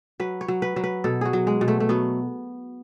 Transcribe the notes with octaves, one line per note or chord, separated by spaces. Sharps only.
F#3 B4
C#5
F#3
B4
F#3
B4
B2 A4
F#4 G#4
F#3
G#3
B2
A3
A3
F#3 B3